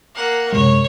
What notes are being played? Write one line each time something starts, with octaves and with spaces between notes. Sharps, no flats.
A#3 F#5
F#2 C3 G#3 C#5